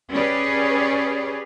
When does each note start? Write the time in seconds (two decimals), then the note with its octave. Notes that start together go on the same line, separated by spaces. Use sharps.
0.12 C#4 G4 G#4 B4 C#5 D5